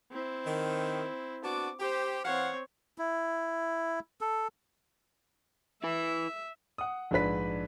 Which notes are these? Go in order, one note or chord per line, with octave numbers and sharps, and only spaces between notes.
C4 E4
D#3
B3 D4 F#4 D6
G4 C5
E3 C4 C#5 F5 F#5
E4
A4
E4 B4 E5
F#5 D#6
A#1 G#2 D4 B4 B6